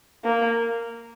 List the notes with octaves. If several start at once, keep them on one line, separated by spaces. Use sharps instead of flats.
A#3